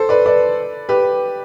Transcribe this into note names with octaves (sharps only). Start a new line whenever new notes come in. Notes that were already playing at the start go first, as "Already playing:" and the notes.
Already playing: A4 C5
B4 D5
B4 D5
G4 B4